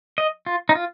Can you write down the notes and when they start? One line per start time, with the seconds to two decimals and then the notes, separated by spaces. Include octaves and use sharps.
0.18 D#5
0.46 F4
0.69 D#4
0.75 F4